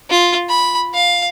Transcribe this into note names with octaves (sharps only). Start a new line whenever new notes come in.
F4
B5
F5